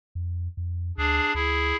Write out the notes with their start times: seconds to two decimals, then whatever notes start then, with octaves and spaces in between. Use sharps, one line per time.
0.15 F2
0.57 F2
0.98 D2 D4 G#4
1.34 D2 E4 G#4